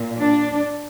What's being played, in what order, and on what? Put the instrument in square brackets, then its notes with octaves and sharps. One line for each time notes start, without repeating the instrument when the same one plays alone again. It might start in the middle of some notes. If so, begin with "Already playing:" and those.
Already playing: [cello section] A#2
D4